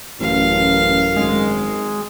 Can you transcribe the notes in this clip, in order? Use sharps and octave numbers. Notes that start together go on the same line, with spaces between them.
A1 F#2 F5
G#1 G#3